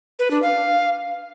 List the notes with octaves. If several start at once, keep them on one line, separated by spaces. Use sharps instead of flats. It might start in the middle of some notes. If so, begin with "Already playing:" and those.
B4
D4
F5